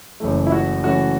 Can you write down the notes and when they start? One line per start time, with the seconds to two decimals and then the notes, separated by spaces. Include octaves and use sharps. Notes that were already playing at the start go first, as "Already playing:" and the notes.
0.20 F#1 F#2 E3 A3
0.47 E4
0.52 F#4
0.84 F#1 F#2 E3 A3 F#4